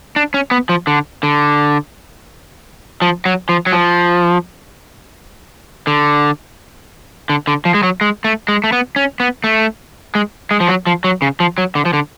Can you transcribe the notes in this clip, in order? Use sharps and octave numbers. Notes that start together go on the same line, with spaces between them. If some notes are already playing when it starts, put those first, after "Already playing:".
D4
C#4
B3
F3
D3
D3
F3
F#3
F3
F#3
F3
D3
D3
D3
F3
G#3
F#3
G#3
A3
G#3
A3
B3
C#4
B3
A3
G#3
G#3
F3
F#3
F3
F#3
C#3
F3
F#3
D3
F3
D3